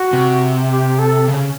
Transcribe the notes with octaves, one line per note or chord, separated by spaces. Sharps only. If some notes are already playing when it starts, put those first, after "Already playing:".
Already playing: F#4
C3
G4
A4
C#3